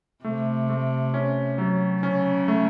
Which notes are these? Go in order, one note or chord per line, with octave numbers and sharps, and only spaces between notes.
C3 A3
A3
C#4
F#3
C#3 C#4
A3